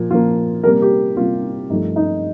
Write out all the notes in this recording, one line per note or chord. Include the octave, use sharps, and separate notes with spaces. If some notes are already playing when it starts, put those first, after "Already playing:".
Already playing: A#2 F3 A#3
A#2 F3 A#3 F4
C3 G3 A#3 A#4
G4
C3 G3 A#3 F4
G2 F3 A3 D#4
D#4